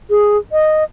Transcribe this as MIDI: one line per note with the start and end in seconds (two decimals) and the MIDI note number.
0.10 0.38 68
0.52 0.84 75